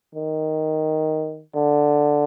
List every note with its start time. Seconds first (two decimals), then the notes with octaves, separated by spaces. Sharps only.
0.15 D#3
1.56 D3